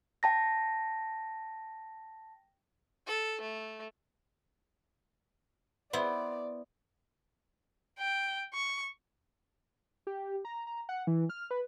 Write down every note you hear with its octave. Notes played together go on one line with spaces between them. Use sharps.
G5 A5 A#6
A4
A3
B3 E4 C5 D5
G5
C#6
G4
A#5
A#5
F#5
E3
F6
B4